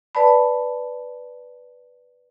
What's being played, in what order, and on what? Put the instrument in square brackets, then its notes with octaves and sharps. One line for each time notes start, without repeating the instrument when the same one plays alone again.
[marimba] B4 D5 A5 B5